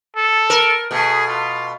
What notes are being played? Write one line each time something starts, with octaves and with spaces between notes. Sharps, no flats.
A4
A#4
B2 A3 G#4
F4